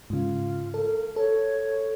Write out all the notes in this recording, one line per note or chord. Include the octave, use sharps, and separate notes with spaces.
G#2 C#3 F4
A4 A#4
A4 C#5